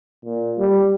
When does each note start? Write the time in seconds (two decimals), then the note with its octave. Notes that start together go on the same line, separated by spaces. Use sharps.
0.25 A#2
0.58 G3